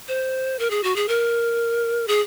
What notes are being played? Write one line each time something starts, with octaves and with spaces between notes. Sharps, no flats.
C5
A#4
G#4
F#4
G#4
A#4
G#4